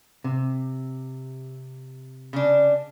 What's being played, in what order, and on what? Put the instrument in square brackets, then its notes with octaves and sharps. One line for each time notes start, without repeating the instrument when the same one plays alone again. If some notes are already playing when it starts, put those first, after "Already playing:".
[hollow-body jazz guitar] C3
[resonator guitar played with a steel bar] C#3 D4